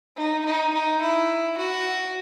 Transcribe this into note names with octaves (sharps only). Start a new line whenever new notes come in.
D#4
D#4
D#4
E4
F#4